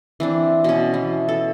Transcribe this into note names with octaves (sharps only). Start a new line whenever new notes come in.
E3 C4 D4
B2 C#4
E3
A4